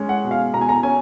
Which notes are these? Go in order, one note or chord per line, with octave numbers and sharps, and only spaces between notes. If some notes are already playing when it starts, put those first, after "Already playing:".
Already playing: G#3 C#4
F#5
B2
F5
B2 A#5
G#5
A#5
C#4 G#5